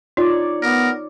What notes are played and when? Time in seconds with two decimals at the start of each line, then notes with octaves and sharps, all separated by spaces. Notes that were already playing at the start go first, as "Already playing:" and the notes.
0.17 D#4 F4 C#5 D5
0.62 B3 A#4